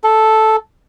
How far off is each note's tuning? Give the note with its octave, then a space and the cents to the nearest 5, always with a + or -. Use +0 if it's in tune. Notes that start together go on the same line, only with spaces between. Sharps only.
A4 -5